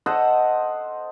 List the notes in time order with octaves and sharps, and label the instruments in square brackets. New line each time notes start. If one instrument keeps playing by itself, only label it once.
[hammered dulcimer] A4 C5 D#5 F#5